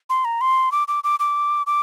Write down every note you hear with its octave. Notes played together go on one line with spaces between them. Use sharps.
C6
A#5
C6
D6
D6
D6
D6
D6